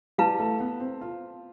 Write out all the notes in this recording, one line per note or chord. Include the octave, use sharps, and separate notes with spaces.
G3 E4 B4 F5 A5
A3
B3
C4
F4